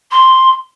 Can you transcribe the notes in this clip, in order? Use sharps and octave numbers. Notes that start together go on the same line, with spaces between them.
C6